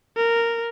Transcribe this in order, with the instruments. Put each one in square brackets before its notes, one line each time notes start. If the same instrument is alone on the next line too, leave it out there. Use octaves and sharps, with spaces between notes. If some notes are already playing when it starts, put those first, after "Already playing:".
[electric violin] A#4